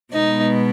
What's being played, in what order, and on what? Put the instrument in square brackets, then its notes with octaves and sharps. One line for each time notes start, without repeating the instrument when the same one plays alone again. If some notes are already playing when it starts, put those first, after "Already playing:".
[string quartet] B2 G#3 B3 D#4